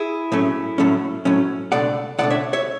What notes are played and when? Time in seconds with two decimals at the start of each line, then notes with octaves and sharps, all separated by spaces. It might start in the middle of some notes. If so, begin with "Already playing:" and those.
Already playing: E4 G#4
0.32 A2 F#3 A3 C#4
0.78 A2 F#3 A3 C#4
1.25 A2 F#3 A3 C#4
1.72 C#2 B2 A3 D4 D5 F#5
2.18 C#2 B2 A3 D4 D5 F#5
2.30 C#5 E5
2.53 C#5 E5